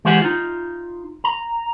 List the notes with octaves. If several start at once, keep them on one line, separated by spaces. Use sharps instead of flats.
E3 G#3 G4 C5 F#5 G#5
D#4 F4
A#5